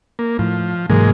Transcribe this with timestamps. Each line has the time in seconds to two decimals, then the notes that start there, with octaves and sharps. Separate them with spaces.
0.19 A#3
0.39 A2 F3
0.90 G#2 C3 E3 F#3 G#3 A#3